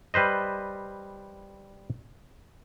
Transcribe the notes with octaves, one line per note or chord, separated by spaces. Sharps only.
G3 B4 C5 D#5